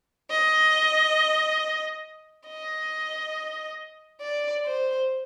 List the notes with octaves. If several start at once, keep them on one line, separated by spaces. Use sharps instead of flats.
D#5
D#5
D5
C5